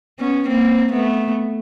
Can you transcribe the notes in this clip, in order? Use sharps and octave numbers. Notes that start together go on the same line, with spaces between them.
B3 C#4
A#3 C4
A3 B3